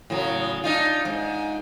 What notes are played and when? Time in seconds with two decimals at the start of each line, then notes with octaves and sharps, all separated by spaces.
0.10 A2 C#3 F#3
0.64 D4 D#4 F4
1.05 G#2